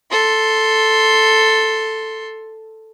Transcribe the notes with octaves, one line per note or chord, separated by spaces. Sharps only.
A4 C6